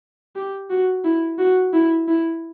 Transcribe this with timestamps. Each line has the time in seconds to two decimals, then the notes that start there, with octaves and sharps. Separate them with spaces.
0.36 G4
0.70 F#4
1.04 E4
1.39 F#4
1.73 E4
2.08 E4